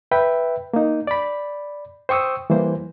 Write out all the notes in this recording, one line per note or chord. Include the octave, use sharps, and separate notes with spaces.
B4 E5 G5 B5
A#3 D#4
D5 B5
C5 G5 C#6 D#6 E6
E3 G3 A#3 C5